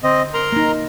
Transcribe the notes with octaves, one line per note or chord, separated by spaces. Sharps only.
D3 C4 D#5
A#4 A#5 C6
A#3 D#4